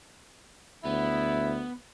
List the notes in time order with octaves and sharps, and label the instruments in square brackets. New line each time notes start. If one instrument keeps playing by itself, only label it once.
[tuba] D2 [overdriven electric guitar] B3 [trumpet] E4